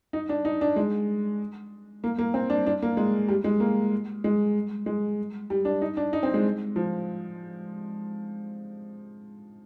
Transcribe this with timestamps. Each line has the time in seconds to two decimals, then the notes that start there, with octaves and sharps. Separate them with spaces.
0.13 D#4
0.29 D4
0.45 D#4
0.61 D4
0.76 G#3
2.04 A#3
2.19 A#3
2.34 C4
2.50 D4
2.67 D4
2.82 A#3
2.97 G#3
3.29 G3
3.44 G#3
3.60 A#3
4.24 G#3
4.86 G#3
5.50 G3
5.65 D4
5.82 D#4
5.97 D4
6.13 D#4
6.23 C4
6.34 G#3
6.76 F3